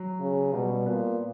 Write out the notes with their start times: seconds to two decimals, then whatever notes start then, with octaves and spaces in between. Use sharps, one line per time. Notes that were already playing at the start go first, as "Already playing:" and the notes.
Already playing: F#3
0.20 C#3
0.53 B2 G3
0.86 A#2 B3